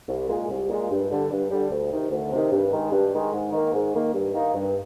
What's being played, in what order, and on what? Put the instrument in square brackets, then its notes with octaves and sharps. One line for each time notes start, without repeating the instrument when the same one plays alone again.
[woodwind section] C2
A#2 G#3
C2
A#2 G#3
G2
D3 G3
G2
D3 G3
D2
C3 D#3
D2
C3 D#3
G2
D#3 G#3
G2
D#3 G#3
G#2
D#3 A#3
G#2
D#3 A#3
G2
D#3 A#3 D#4
G2